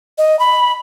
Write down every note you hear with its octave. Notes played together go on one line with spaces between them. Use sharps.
D#5
B5